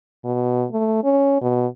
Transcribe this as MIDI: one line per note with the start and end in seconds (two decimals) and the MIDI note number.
0.25 0.65 47
0.72 1.00 57
1.04 1.40 61
1.41 1.67 47